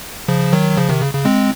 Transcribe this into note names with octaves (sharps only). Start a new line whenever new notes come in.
C#3 F3
D#3 F#3
C#3 F3
C3 D#3
C#3
C#3
G#3 C4